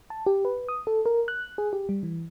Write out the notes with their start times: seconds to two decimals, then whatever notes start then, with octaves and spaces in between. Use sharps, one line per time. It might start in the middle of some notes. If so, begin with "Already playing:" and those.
0.10 A5
0.26 G4
0.45 B4
0.68 D#6
0.87 A4
1.06 A#4
1.28 F#6
1.58 G#4
1.73 G4
1.89 G3
2.03 E3